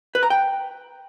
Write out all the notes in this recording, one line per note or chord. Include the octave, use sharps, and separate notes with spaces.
B4
A#5
G5